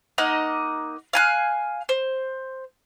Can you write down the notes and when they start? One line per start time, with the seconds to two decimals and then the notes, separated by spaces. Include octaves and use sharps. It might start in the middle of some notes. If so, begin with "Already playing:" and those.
0.18 A#3 D#4 D#5 F#5
1.13 F5 G#5 F#6
1.89 C5